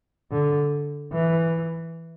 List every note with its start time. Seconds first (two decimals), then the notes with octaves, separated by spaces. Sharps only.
0.32 D3
1.13 E3